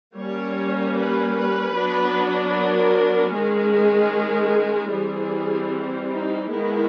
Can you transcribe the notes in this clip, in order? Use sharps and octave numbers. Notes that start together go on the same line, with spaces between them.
G3 A#3 C#4 C#5
B4
B4
F#3 B3 D4
A#4
D#3 G#3 C#4 G#4
E3 G3 C4 G#4
D#4
D#3 G#3 B3 E4